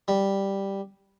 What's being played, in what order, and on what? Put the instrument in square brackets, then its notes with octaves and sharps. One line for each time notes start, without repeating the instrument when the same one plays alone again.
[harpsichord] G3